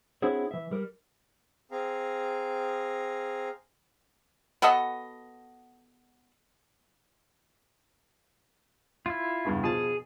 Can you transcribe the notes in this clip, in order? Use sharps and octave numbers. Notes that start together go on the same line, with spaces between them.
C4 D4 E4 F#4 G#4 C#5
E3 E5
G3 A#4
C4 G#4 F5 A#5
B3 F#4 A4 D#5
E4 F4
E2 G2 C#3
B2 F3 G#4 A5